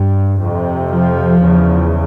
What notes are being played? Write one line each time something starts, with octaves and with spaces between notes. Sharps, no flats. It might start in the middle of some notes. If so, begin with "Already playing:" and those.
Already playing: G2
F2 C3
F3
E2 C#3